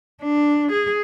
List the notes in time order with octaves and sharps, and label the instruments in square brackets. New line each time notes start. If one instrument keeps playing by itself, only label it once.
[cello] D4
G#4